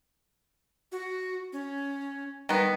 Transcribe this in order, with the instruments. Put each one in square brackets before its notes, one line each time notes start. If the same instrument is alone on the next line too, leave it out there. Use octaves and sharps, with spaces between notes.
[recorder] F#4
C#4
[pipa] D#3 B3 [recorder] G3